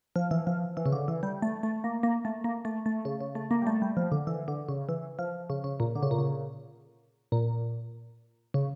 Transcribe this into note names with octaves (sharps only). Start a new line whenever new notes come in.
F3
E3
F3
E3
C#3
D3
E3
G3
A3
A3
A#3
A#3
A3
A#3
A3
A3
C#3
C#3
A3
A#3
G3
A3
G3
F3
D3
E3
D3
C#3
E3
F3
C#3
C#3
A#2
D3
C#3
A#2
C#3
A#2
C#3